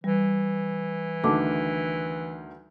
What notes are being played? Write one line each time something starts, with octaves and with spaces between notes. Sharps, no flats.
E3 G3
D2 D#3 A4 A5 D6